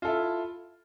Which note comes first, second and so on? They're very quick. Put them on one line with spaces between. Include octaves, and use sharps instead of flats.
F4 A4 E4